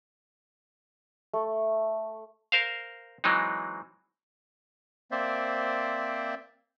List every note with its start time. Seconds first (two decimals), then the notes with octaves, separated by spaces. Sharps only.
1.33 A3
2.52 A#4 C5 F5
3.24 E3 F#3 G#3 C4 D#4
5.11 A#3 C4 C5 D5 E5